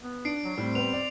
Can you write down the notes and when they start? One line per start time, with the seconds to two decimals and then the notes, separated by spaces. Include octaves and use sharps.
0.03 B3
0.25 D4 C7 D7
0.44 F#3
0.58 A2 G3 C4
0.75 B3 B4 F7
0.93 D5